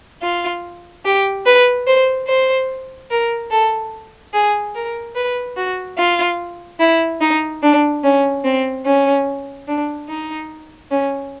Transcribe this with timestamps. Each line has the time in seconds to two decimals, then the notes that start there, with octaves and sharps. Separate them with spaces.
0.23 F4
1.05 G4
1.46 B4
1.87 C5
2.28 C5
3.11 A#4
3.51 A4
4.34 G#4
4.75 A#4
5.16 B4
5.57 F#4
5.98 F4
6.80 E4
7.21 D#4
7.63 D4
8.03 C#4
8.44 C4
8.85 C#4
9.68 D4
10.09 D#4
10.91 C#4